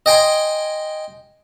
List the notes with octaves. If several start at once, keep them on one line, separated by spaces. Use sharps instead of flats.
D#5 G5 G#5 C6